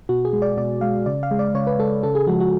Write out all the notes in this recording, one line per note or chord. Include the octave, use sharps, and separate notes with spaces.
B2 F#4
G#4
G#3
D5
B2 D5
G#3 F5
C#3 D5
F5
G#3
D5
C#3 C#5
B4
G#3 A4
C#3 A4
G#4
F3 G#3 F#4
F#4